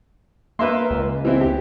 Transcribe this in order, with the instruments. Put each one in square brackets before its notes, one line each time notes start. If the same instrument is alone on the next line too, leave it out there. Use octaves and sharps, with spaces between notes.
[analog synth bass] A#3 [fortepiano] B4 E5 C6
[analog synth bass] C#2
[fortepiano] E3 C4 E4
G4